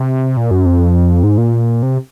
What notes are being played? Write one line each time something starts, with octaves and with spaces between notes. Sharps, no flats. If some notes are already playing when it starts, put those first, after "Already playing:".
Already playing: C3
A#2
F#2
F2
G#2
A#2
C3